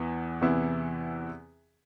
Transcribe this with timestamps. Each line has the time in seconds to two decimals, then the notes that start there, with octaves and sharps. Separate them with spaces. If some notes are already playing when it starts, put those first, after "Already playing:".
Already playing: E2 E3 B3 E4
0.41 E2 C3 E3 B3 E4